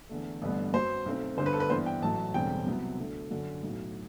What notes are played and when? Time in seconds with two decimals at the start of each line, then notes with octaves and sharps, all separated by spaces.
0.09 E2 D3 A3
0.42 A1 G2 D3 G3 B3
0.73 F#2 F#3 B3 C5
1.06 B1 B2 A3 C4
1.37 G1 G2 D3 C5
1.46 B4
1.53 A4
1.60 B4
1.70 G2 E3 B3 D4 C5
1.86 G5
2.02 A1 A2 F#3 A5
2.34 E1 E2 D3 G3 C4 G5
2.66 C2 C3 F#3 B3
2.99 D2 D3 A3
3.31 G1 F#2 D3
3.63 B1 A2 F#3